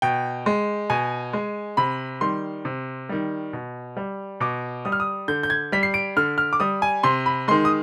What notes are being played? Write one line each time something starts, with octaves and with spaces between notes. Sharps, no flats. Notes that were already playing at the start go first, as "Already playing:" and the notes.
B2 G5
G#3
B2 G#5
G#3
C3 B5
D#3 G3 C6
C3
D#3 G3
B2
G3
B2 D6
G3 D#6
F6
D#6
D3 G6
G6
G#6
G3 B6
C7
D7
D3 F6
F6
D6
G3 D#6
G#5
C3 C6
B5
D#3 G#3 C6
D#6